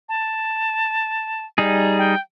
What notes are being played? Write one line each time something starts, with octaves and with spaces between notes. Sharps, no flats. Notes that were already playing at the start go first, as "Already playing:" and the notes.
A5
G3 D#4 G#4
G5